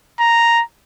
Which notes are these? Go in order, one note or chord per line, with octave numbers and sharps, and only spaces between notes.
A#5